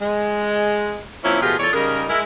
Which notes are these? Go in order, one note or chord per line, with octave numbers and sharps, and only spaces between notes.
G#3
F3 A#3 C4 C#4 E4
B2 F3 A3 F4 G4 G#4
E2 F4 A4 C#5 D5
C#3 G3 D#4 G#4 A#4
G#3 E4 A#4